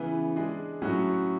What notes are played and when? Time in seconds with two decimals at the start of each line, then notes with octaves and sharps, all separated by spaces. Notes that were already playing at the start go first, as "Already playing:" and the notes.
Already playing: C#3 E3 B3
0.36 G#3 D4 G#4
0.82 A2 F#3 A3 C#4 F#4